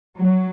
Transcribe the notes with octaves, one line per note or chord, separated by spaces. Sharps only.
F#3